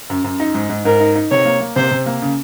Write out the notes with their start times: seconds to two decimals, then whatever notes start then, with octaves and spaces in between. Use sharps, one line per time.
0.10 F#2
0.24 F#2
0.40 D#4
0.55 G#2
0.70 G#2
0.85 G#2 A#4
1.00 D#4
1.15 D#4
1.31 C3 C#5
1.45 A#3
1.61 A#3
1.76 C3 C5
1.91 C3
2.06 A#3
2.22 C#3